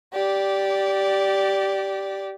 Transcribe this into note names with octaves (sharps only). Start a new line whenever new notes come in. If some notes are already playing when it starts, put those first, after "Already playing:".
G4 D5